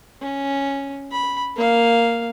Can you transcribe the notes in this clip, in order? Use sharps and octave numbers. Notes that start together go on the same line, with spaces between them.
C#4
B5
A#3 F5